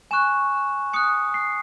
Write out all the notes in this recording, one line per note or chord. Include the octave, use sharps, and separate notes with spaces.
G#5 C#6 F#6 E7
G#5 D#6 F#6 C#7
C7